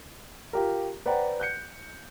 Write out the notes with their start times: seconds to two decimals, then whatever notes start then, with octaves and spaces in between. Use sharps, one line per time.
0.53 F4 G4 A#4
1.06 B4 C5 D5 F#5 G5 A#5
1.40 F#6 G6 C#7